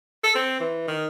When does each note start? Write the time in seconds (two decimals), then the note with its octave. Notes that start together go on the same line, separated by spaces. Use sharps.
0.24 A4
0.35 C4
0.60 E3
0.88 D#3